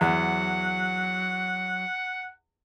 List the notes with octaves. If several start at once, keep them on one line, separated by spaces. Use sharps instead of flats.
E2 F#3 F#5